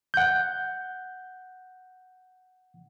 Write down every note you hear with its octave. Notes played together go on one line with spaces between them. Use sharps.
F#5 G6